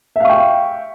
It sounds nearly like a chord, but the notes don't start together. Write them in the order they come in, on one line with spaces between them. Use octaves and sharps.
E5 F5 C#6 G5